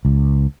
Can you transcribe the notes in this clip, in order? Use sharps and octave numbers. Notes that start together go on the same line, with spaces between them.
C#2